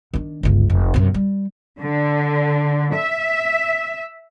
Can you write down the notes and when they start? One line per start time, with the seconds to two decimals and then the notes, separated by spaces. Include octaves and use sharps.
0.14 D#3 D4
0.43 G1 C#2
0.70 F1
0.94 F#2 C3
1.14 G3
1.79 D3
2.94 E5